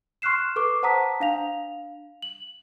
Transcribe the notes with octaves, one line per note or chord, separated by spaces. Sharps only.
C6 C#6 F6 F#6 C7 E7
A4 B4 C#6 D6
C5 F#5 A5 A#5 D#6 B6
D4 F5 F7
F#7